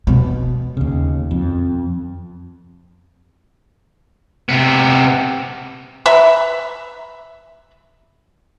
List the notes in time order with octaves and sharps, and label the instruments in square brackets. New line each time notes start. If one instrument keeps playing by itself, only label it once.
[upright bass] B2
[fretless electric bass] D#2 C#3
F2
[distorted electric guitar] C3 B3
[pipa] B4 E5 A#5 B5